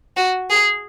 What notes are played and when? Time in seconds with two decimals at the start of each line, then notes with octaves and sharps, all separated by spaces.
0.17 F#4
0.50 G#4